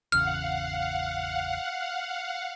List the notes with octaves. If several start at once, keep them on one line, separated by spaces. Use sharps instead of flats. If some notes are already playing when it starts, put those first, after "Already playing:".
G#1 E2 C#3 F5 F#5 F6